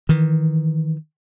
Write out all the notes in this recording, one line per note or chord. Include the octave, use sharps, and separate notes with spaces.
D#3 E3